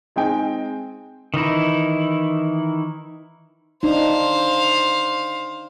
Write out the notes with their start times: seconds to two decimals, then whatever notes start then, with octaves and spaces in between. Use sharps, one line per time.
0.16 G#3 C4 D#4 G5 G#5
1.34 D#3 E3 D#4 E4
3.83 D4 D#4 C5 F5